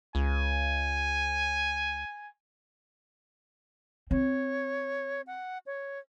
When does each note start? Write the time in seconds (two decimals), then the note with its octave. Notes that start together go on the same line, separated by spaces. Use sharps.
0.15 C#2 G#5
4.11 C4 C#5
5.27 F#5
5.66 C#5